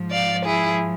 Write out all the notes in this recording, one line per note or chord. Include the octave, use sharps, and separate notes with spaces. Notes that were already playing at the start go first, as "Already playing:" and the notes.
Already playing: G#2 F3
D5 F5
E4 G#4